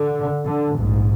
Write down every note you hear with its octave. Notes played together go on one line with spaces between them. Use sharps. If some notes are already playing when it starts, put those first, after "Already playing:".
Already playing: D3
D3
A#1 G#2